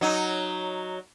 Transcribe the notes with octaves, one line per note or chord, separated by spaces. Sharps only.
F#3 D#4